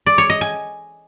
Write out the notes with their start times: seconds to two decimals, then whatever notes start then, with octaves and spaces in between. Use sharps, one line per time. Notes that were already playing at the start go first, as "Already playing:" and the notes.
0.06 D5
0.18 C#5
0.30 D#5
0.41 G#5